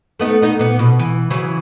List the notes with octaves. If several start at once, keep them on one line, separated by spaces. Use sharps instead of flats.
A3 B3 D#4
B3 D#4
A#2 B3
B2
E3
C#3 E3 F#3